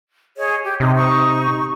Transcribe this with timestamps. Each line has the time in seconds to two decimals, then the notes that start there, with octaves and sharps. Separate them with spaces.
0.36 G#4 C#5 D#5
0.64 G4
0.80 C3 D#4 D#5
0.93 D#4 C#6